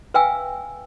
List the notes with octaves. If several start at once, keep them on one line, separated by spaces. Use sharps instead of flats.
B4 E5 F5 G5 G#5 E6